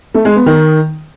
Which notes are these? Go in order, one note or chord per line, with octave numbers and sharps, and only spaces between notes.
A3
G#3
B3
D#3